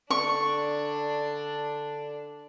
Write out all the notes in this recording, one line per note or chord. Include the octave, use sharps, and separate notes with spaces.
D3 D4 C#6